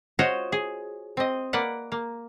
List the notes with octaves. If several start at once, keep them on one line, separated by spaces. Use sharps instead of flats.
F4 F#4 C5 C#5 D#5
G#4
C4 D#5
A#3 B4 D5 F#5
A#3